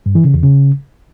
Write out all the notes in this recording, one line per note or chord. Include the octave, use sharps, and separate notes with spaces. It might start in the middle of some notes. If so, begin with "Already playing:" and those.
G2
E3
C#3
E2
C#3